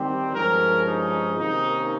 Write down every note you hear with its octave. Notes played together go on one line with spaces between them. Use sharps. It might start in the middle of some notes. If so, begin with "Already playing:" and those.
Already playing: D#3 G3 C4 G4
G2 F3 G#3 C#4 A#4
D#4
C3 D#3 A#3 C#4 D#4